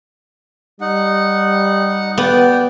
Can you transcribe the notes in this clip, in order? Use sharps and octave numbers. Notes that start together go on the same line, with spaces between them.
G3 D#4 F#5
B3 D5 G5